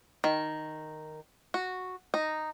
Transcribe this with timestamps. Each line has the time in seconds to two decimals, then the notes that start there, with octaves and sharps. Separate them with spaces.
0.24 D#3
1.54 F#4
2.14 D#4